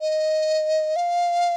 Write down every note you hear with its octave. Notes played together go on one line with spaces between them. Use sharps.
D#5
F5